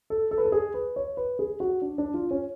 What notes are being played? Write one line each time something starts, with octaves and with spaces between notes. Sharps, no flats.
A4
A4
B4
A4
G#4
B4
C#5
B4
G#4
F#4
D4
D4
F4
C#4